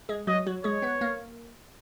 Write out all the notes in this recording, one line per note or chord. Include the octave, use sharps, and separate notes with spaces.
G#3 G#4
F#3 F#4 D#5
F#3 F#4
G#3 G#4 C#5
B3 B4
A#3 A#4